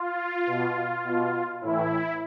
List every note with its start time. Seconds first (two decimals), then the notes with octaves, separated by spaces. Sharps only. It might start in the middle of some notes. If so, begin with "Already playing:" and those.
Already playing: F4
0.46 B2
1.04 B2
1.61 A2 E3 E4